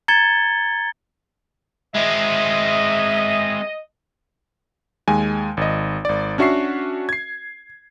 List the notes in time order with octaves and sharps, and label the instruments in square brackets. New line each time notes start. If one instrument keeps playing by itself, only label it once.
[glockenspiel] A#5 G#6 A6 C#7 G7
[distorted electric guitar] G#3 C4 [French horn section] D#5 [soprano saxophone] E5
[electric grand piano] D#2 G#3 G#5
G#1 D#5
G#1 D5
C#4 D4 F#4 E5 C#6 C7
G#6 C7